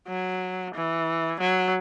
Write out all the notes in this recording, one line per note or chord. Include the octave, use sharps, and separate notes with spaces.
F#3
E3
F#3